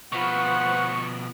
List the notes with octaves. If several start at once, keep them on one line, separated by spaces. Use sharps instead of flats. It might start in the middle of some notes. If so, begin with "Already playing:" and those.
B2 F3 F4 B4 C5 F#5 C#6